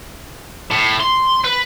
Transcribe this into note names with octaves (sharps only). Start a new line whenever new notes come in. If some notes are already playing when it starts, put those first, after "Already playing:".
A2
C6
B4